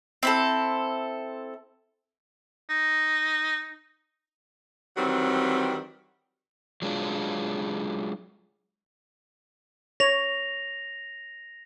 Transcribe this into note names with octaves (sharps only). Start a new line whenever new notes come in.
C4 E4 A4
D#4
D#3 E3 F#3 G3 C4
F#3 G#3 D4 F4
C#5 A#6 F7